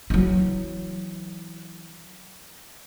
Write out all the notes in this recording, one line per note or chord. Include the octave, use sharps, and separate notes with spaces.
E3 F#3